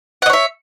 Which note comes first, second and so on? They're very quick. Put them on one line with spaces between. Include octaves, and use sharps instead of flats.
F#5 D#5 C#5 E5